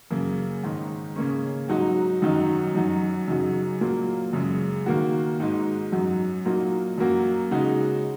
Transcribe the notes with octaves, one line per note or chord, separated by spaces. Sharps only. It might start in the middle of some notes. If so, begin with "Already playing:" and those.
F#2 C#3 A#3
G#2 D#3 G#3 D#4
C#3 A#3 C#4
G#2 F#3 D#4 F#4
F#2 D#3 F#3 D#4 F#4
F#2 F#3 D#4 F#4
F#2 C#3 F#3 D#4 F#4
A#2 F#3 A#3
F#2 C#3 G#3
D#3 A#3 F#4
G#2 G#3 D#4 F#4
F#2 F#3 D#4 F#4
A#2 F#3 A#3 D#4 F#4
F#2 F#3 A#3 F#4
C#3 G#3 D#4 F#4